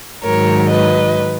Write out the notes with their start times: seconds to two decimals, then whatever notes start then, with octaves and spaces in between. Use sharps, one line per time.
0.24 G#2 D#3 F#3 A#4 C#5
0.71 B4 D#5